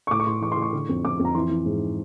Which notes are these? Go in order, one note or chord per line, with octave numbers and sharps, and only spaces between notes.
C#6
A2 D6
C#6
A2 C6
E3 C#6
C6
A2
C#6
D3
F2
F2 D6
F2
A#5
E3 C6
E3
G#2